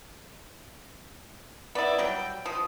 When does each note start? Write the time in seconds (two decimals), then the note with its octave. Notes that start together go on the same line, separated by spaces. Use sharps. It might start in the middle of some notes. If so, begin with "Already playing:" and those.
1.75 B3 E4 D5
1.98 F#3 G3 G5
2.45 F3 D#6